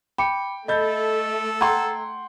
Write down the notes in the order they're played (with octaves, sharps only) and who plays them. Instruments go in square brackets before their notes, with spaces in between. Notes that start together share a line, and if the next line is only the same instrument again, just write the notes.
[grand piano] G5 [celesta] B5 D6 C#7
[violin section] A3 [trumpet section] A4 [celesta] D#5 [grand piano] B5 G6 A6
[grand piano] F#5 G5 C6 [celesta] A#5 E6 G#6